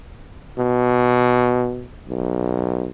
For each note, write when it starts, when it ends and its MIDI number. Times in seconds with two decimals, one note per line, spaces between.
0.58 1.87 47
2.08 2.90 35